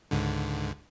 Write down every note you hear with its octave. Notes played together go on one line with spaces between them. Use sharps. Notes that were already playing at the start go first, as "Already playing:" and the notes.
C#2 G#2 D3